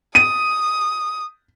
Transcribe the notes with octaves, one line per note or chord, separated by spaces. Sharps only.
D#6 D#7